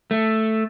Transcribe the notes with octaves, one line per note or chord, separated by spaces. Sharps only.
A3